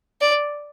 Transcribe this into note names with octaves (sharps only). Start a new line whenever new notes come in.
D5